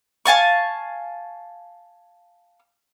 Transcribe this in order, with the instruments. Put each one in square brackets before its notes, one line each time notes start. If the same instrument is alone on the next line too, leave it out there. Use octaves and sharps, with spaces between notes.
[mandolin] F5 G#5 A5 C#6